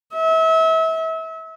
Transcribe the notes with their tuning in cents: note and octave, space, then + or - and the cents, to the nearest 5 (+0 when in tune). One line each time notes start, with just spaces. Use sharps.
E5 -35